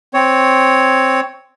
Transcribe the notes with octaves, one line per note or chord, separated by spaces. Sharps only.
C4 C#5